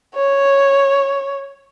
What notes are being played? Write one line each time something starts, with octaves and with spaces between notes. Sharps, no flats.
C#5